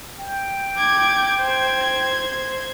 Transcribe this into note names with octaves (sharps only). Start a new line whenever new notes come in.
G5
D6 G#6
C5 G#6